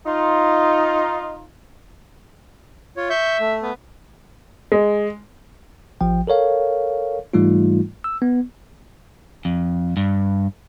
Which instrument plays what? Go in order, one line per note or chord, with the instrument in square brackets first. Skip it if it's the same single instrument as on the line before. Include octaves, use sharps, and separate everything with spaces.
[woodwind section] D#4 F4
[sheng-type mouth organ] F4 C#5
[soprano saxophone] E5 [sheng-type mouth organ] C#6 G6
[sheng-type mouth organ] A3
[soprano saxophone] B3
[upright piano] G#3
[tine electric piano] A1 F3 G5
A4 A#4 C#5 F5
G#2 E3 G3 A3 D#4 F4
E6
B3
[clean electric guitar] F2
G2